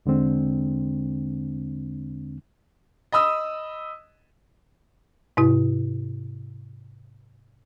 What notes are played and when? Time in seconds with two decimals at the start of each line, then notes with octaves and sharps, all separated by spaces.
0.06 E2 D3 G#3 C4 D4
3.12 D#5 B5 D#6 E6
5.37 G#2 C3 E4